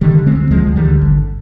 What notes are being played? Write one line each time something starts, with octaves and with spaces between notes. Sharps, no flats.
D3 D#3 G3
D3
G#3 C4
D2
D2 F3 G#3
D2
D#3 G3
D3
G#1